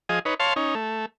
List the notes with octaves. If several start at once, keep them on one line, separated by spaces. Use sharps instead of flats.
F3 G#4 D#5
D#4 B4 C#5
C#5 F5 A5 C6
C#4 D#4
A3